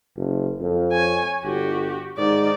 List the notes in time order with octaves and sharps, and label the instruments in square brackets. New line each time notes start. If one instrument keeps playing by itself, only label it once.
[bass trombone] F#1
F2
[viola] C#5 G#5
[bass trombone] G1 [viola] F#4 G4
[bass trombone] G#2 [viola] D#3 D5